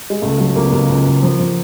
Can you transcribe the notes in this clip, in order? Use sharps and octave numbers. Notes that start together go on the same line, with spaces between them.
G#3
C#2 A3
F#3 A3
C#2 A#3
B3
C#2 A#3
C#2
C#2
F3
F3